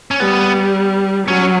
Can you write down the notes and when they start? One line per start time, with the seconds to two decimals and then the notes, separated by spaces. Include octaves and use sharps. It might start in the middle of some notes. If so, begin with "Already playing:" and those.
0.11 C#4
0.20 G3 B3
1.27 F#3 C#4